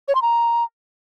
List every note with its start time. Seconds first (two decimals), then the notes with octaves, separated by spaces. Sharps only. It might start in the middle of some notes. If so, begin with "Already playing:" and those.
0.08 C#5
0.15 C6
0.22 A#5